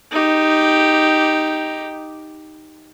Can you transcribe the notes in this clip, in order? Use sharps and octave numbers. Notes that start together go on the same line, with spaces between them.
D#4 G4